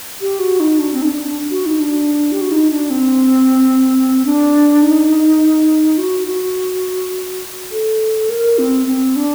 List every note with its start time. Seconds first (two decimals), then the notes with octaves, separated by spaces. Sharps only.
0.21 G4
0.40 F#4
0.60 D#4
0.79 D4
0.93 C4
1.02 D#4
1.07 D4
1.22 D4
1.51 F#4
1.66 D#4
1.80 D4
2.32 G4
2.41 F#4
2.52 D#4
2.70 D4
2.90 C4
4.25 D4
4.83 D#4
5.98 F#4
6.27 F#4
7.71 A4
8.30 A#4
8.59 C4
8.87 C4
9.16 D4